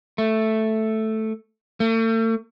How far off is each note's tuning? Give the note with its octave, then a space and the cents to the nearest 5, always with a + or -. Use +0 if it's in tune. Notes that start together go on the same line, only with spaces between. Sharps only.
A3 +0
A3 +40